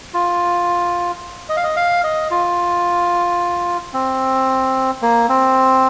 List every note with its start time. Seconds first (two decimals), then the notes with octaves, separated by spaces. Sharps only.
0.14 F4
1.49 D#5
1.57 F5
1.64 D#5
1.77 F5
2.04 D#5
2.31 F4
3.93 C4
5.02 A#3
5.29 C4